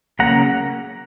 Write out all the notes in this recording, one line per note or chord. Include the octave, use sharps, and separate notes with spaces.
C#3 F#3 A#3 C#4 F#5 A#5